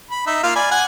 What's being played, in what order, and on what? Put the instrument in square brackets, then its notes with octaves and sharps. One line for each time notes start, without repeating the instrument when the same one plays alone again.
[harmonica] B5
D#4 E5
A#3 F4 F5
D5 G#5 B5
F#5 G#5